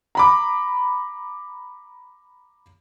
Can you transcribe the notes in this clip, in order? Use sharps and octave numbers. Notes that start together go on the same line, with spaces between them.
A#5 B5 D6